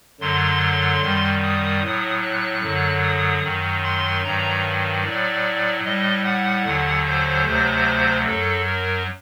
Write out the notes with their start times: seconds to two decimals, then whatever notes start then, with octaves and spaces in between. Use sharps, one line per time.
0.21 F#2 D3 F#3 C6
1.01 F#2 D#3 G3
1.42 D#6
1.83 A2 F#3
2.23 F#6
2.63 F#2 D3 F#3
3.03 D#6
3.43 F#2 D#3 F#3
3.83 C6
4.24 G2 D#3 F#3 A#5
5.04 A2 F#3 D5
5.84 A2 G3 D#5
6.24 F#5
6.65 D#2 D3 F#3
7.05 C5
7.45 D2 C3 F#3 C5
8.26 F#2 F#3 A4
8.67 A#4